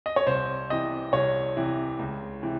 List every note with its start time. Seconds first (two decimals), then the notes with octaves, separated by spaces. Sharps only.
0.06 D#5
0.16 C#5
0.27 C2 C5
0.70 C3 E3 D#5
1.12 C2 C#5
1.57 C3 E3
1.99 C#2
2.42 C3 E3